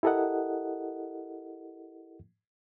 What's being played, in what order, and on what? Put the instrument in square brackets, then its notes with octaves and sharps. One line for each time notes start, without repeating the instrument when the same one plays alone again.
[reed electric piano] E4 G4 A4 A#4 D#5 F#5